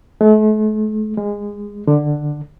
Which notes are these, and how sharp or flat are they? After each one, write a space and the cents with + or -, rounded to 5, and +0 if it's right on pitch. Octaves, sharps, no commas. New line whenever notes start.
A3 -40
G#3 -20
D3 +10